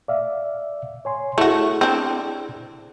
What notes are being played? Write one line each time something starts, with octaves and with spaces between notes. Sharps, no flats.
D5 E5 F5
C#5 G#5 C6
A3 E4 F#4 G#4
C4 D4